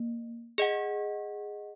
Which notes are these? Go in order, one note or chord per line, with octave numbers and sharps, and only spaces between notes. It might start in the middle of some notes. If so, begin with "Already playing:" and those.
Already playing: A#3
G#4 D#5 F#5